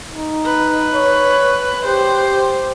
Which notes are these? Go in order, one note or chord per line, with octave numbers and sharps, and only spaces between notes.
D#4
B4
C#5
G4 C5